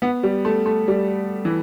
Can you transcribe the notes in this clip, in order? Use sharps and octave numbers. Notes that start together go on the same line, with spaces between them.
B3
G3
A3
A3
G3
E3